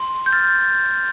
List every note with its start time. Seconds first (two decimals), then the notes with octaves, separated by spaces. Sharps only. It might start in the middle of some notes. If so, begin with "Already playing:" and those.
Already playing: C6
0.26 G6
0.32 F6 A6